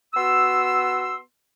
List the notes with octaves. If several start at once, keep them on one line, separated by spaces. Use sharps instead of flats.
B3 F#4 C6 E6